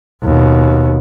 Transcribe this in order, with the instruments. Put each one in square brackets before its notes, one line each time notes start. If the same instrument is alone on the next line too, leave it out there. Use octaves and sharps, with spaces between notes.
[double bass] D#2 B2